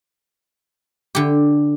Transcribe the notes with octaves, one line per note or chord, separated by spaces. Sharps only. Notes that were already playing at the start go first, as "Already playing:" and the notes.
D3 G4